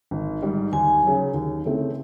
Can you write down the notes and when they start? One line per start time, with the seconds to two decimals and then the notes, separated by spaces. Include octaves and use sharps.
0.11 G#1
0.42 G#2 D#3 G3
0.73 D#2 G#5
1.03 C#3 F#3
1.34 D#2
1.65 C#3 E3 A3 C4